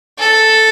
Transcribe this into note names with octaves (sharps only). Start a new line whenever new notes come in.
A4